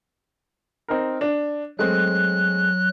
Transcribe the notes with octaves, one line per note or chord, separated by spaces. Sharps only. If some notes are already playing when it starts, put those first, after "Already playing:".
C4 D#4 A#4
D4
F#3 G#3 A3 C4 F#6